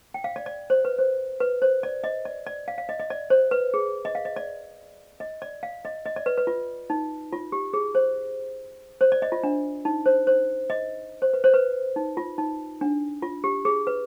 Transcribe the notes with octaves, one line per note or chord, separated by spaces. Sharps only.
G5
F5
D5
D5
C5
B4
C5
B4
C5
D5
D#5
D5
D5
F5
F5
D#5
D#5
D5
C5
B4
G#4
D#5
F5
D#5
D5
D#5
D5
F5
D#5
D#5
D5
B4
B4
F4
D#4
F4
G4
G#4
C5
C5
D5
D#5
F4
D4
D#4
C5
C5
D#5
C5
B4
C5
B4
D#4
F4
D#4
D4
F4
G4
G#4
B4